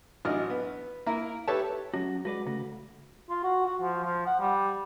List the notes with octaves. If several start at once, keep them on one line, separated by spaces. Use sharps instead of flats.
A1 F#3 D4 D#5 F6
B3
A#3 E4 A#4
G4 A4 B4 C#5 E5 A5
F#3 C#4 F#4
G#3 F#4 B4 D5
C#3 A3 F#4
F4
F#4
F#4
F3
F3
F#5
G3